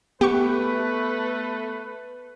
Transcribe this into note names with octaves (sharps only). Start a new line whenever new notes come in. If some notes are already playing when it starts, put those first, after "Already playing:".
A3 B3 G4 B4 C#6